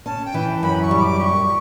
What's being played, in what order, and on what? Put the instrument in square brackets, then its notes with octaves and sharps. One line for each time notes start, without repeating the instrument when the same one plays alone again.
[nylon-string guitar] C#4 [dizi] A5
[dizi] G5
[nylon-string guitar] E3
[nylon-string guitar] F#2 [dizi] B5
[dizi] C#6
[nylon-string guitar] G3
[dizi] D6
[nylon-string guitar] G4 [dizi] C#6